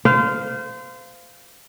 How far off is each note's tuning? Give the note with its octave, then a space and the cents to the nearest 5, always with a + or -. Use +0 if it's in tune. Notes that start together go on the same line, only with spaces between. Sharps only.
C5 -30 F5 +0